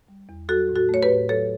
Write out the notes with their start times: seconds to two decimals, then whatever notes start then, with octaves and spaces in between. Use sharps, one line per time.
0.08 G3
0.29 E2
0.48 F#3 F#4 A4
0.69 A2
0.76 F#4 A4
0.89 A3 C#5
1.02 G4 B4
1.09 A2
1.29 F#3 A4 C#5